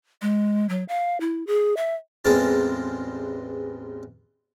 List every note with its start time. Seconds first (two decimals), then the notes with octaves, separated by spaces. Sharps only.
0.22 G#3
0.69 F#3
0.88 F5
1.20 E4
1.47 G#4
1.77 E5
2.25 A1 E2 G#3 C4 F4 A5